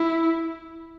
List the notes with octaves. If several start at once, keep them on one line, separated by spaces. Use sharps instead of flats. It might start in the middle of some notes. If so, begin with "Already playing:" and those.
Already playing: E4